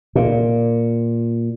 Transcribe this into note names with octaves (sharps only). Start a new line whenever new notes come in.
A#2